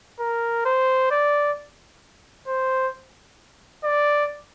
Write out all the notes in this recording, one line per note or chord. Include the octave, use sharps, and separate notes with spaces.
A#4
C5
D5
C5
D5